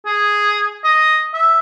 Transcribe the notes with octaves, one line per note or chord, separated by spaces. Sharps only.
G#4
D#5
E5